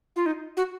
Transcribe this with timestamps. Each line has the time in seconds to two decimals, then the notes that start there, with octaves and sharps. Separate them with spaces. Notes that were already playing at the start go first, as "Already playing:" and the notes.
0.16 F4
0.26 D#4
0.57 F#4